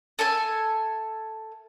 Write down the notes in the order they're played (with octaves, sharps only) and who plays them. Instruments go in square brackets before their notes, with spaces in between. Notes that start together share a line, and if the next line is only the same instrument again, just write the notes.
[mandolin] A4 E5 G#5